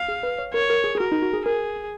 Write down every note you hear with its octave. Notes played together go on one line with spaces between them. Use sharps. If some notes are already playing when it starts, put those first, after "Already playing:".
Already playing: F5
G#4
B4
C#5
A#4 C#5
A#4
G#4
G#4
F#4 A#4
D#4
F#4
G#4
G#4 A#4